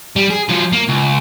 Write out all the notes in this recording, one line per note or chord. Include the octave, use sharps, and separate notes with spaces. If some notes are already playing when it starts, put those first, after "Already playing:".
G3
G#4
F#3 F4
A#3
C#2